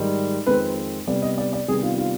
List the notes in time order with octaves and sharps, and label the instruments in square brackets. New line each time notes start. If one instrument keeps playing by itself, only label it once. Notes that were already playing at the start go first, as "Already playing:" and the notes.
Already playing: [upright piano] G#2 D#3 G3
F2 D#3 G#3 C4 B4
C3 G3 B3 D5
D#5
D5
D5
C3 D#3 G3 B3 G#4
F4
F4